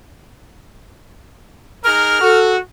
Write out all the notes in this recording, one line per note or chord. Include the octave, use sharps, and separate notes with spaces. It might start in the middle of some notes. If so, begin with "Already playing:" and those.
D#4 G#4 A#4 F6
F#4 A4